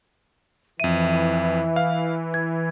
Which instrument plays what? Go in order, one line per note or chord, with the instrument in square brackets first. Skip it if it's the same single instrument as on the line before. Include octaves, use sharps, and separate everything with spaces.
[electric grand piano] F2 D#7 [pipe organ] E3 [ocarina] E5
[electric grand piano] F5
G#6